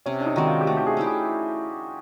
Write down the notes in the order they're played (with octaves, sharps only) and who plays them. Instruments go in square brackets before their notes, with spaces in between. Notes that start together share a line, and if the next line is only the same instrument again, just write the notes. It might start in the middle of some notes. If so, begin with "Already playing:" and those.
[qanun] C3 [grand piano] C#4
[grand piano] D4
D#4
[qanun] D#3 G#3 C4 [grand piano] F#4
[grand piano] F4
G4
[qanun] A3 [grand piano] F#4
[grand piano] G4
G#4
[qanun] C#4 E4 G4
[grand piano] G#4